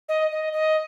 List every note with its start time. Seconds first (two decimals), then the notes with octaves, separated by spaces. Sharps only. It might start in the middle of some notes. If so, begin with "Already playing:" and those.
0.09 D#5
0.31 D#5
0.53 D#5